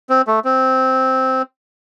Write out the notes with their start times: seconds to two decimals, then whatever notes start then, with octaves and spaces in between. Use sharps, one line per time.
0.10 C4
0.27 A3
0.45 C4